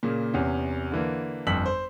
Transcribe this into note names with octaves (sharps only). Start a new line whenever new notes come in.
A#2 C#3 A#3
E2 C3 C#4
D3 E3 A#3
G1 F2 E6 B6 F#7
C5